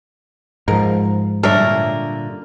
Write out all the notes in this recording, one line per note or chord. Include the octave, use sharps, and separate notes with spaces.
G#2 F3 A#4
A#2 D3 G3 D4 A#4 C#5 E5